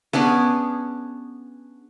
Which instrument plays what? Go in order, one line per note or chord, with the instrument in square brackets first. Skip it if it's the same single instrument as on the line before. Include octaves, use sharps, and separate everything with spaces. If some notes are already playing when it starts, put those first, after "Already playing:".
[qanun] B3 C#4 D4 G#4